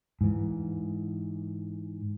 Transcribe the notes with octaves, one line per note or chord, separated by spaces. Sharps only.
G#2 E3